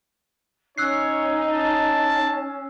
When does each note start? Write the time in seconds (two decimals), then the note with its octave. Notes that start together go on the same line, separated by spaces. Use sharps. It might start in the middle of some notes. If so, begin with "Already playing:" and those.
0.78 C#4 D#4 C#5 E6 F#6 C7
1.53 C#4 A5